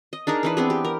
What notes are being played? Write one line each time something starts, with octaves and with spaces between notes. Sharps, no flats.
D#5
D4 D#4 G#4 A#4
E3 D4 B4
B3 C4 G#4
G4
A#4